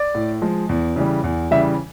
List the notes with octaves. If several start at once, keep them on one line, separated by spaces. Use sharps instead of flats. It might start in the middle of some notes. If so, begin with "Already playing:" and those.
Already playing: D5
A2
F3 G#3
E2
C#3 E3 G3
E2
C#3 E3 G3 E5